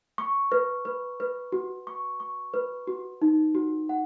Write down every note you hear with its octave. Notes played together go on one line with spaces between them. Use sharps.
C#6
B4
B4
B4
F#4
C#6
C#6
B4
F#4
D#4
F#4
F#5